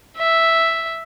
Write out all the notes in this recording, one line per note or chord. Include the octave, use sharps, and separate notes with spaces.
E5